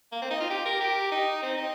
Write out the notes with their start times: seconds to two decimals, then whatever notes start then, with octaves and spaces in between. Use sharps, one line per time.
0.12 A#3
0.22 C4
0.31 D#4
0.41 F4
0.50 G4
0.66 A#4
0.81 G4
1.12 D#4
1.43 C4
1.58 D#4